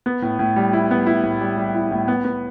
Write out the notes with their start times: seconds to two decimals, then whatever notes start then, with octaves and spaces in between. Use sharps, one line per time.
0.06 B3
0.22 A2
0.39 A2
0.56 G3
0.73 E4
0.91 B3
1.07 E4
1.23 A2
1.41 G3
1.57 G3
1.75 E4
1.91 A2
2.08 B3
2.25 B3